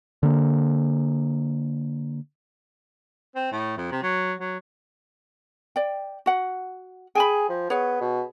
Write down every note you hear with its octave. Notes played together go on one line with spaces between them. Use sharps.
D3 A#3
C4
A2
F2
C3
F#3
F#3
D5 G5
F#4 F#5
G#4 G5 G#5 B5
F3
B3 G#4 C#5
B2